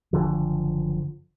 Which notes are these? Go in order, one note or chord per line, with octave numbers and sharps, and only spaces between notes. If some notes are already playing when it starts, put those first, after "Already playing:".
F#1 C2 D3 F3